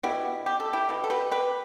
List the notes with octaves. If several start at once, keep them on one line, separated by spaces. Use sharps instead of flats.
B2 B3 E4 G4
G4
A4
E4 G4
B2 B3
A4
G4 B4
G4 B4